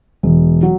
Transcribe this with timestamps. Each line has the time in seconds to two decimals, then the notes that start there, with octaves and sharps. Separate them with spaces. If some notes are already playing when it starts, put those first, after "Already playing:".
0.23 E1
0.63 F#3